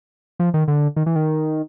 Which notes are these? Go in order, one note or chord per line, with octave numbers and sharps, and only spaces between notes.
F3
D#3
D3
D#3
E3
D#3